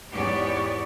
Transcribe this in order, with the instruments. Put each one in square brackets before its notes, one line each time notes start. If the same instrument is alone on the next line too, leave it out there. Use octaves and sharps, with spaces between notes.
[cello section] E2 G#2 B3 G4 C#5 D5